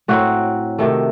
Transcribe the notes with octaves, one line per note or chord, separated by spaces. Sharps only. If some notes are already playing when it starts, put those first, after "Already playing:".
A2 F#3 C4 F#4
C3 D#3 A3